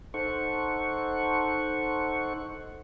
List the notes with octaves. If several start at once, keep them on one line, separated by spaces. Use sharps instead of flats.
D#4 A4 C5 F#5 C#6